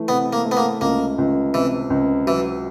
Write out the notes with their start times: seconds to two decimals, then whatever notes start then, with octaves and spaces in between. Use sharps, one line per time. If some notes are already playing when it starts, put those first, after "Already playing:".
Already playing: E3 A3
0.08 C3 B3
0.33 A#3
0.45 A3
0.52 B3
0.57 A#3
0.81 C#2 A#3
1.18 C#2
1.54 C3 E3
1.90 C#2
2.27 E3 F#3